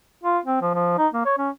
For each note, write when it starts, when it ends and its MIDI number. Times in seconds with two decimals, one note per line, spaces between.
0.24 0.39 65
0.45 0.61 60
0.61 0.70 53
0.74 0.94 53
0.98 1.07 63
1.13 1.25 58
1.25 1.36 73
1.38 1.50 61